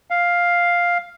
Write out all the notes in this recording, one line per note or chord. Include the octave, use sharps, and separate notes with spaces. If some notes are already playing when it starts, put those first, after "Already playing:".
F5